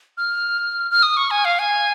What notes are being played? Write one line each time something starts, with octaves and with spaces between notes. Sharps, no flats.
F6
F6
D#6
C#6
G#5
F5
G#5